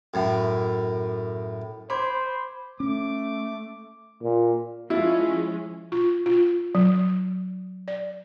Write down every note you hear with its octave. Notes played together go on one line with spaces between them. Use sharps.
F#2 A2
C5 B5 C6 D6 G#6
A3 C#4 D6
A#2
F3 G#3 C#4 E4 F4
F4
F4
F#3
D5